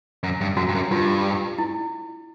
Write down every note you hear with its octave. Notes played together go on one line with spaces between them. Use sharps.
F#2
G2
F#2 F#4
G2
F#2
G2 F4
E4